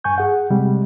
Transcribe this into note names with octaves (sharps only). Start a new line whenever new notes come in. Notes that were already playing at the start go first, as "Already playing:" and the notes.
G2 G#5 C#6 G6
G#4 F#5
C3 G3 G#3